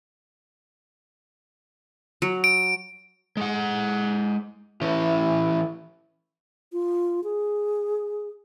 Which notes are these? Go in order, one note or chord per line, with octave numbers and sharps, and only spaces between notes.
F#3
D7
G#3 F#5
E3 C#4 E4
F4
G#4